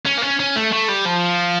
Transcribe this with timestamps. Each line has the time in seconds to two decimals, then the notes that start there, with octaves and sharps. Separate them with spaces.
0.06 C#4
0.18 A#3
0.23 C#4
0.40 C#4
0.56 A3
0.73 A3
0.89 G3
1.06 F3